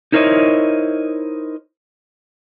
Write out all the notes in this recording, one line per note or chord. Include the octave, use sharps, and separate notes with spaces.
D#4 E4 A#4 C5 C#5 D#5